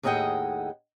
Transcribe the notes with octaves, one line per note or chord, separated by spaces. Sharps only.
D#2 A2 G#4 D#5 F#5 G5